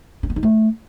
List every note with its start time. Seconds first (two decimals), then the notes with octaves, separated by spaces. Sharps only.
0.23 C#4
0.30 B3
0.36 D#4
0.43 A3